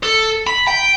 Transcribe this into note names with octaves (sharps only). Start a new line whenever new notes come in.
A4
B5
G5